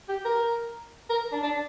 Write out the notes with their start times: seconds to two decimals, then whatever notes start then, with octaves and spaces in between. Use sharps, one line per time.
0.09 G4
0.25 A#4
1.10 A#4
1.32 D4
1.43 D4